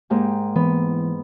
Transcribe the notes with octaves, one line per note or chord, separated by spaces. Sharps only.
G#2 A#3 G4
E3 B3